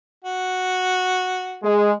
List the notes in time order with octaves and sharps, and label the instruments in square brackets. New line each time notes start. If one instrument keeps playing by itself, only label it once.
[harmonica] F#4
[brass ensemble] G#3